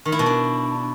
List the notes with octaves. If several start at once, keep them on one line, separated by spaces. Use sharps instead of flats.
D#3
E4
B2
D4